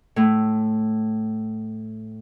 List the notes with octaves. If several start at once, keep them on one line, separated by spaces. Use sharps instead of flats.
A2 A3